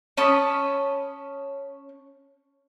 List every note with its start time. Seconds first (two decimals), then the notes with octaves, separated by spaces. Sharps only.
0.17 C#4 A5 B5 D#6